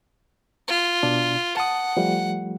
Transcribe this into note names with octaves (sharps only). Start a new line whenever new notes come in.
F4
B2 D4
F#5 A5 D#6
F3 G3 A3